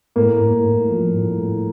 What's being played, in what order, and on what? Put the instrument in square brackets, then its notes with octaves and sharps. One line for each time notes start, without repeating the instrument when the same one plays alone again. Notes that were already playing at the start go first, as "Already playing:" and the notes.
[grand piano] A2 A#3
A2
A2
F3
A2
A2